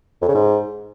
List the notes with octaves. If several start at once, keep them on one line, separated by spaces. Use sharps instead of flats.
F2
C#3
G#2